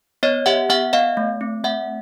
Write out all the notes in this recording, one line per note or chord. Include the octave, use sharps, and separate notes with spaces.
B3 C#5 D#5
G4 E5 F#5
B3 E5 F#5
B3 D#5 F5
A3
C4
A3 E5 F#5